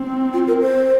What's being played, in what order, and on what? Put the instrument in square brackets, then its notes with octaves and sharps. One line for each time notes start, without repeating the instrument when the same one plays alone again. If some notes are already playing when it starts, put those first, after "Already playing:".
Already playing: [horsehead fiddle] C4
[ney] F4
A#4
C5